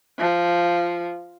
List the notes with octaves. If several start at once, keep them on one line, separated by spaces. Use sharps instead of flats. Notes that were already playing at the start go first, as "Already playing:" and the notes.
F3